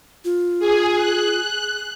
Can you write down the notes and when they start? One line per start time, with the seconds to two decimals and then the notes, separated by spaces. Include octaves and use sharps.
0.25 F4
0.59 G#4
0.96 F#6